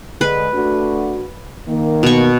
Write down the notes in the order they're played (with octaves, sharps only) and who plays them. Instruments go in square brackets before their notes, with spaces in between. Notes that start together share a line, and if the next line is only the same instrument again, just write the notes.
[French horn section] D3 G#3 [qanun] B4
[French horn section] A3 D4 F#4
D#3 A#3
[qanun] B2 C#6